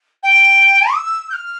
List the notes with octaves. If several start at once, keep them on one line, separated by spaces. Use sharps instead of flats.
G5
E6
G6
F6